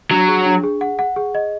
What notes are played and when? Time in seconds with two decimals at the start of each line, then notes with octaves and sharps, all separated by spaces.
0.11 F#3 D4
0.28 G#4
0.46 D4
0.63 G#4
0.81 F#5
0.99 F#5
1.16 G#4
1.35 D#5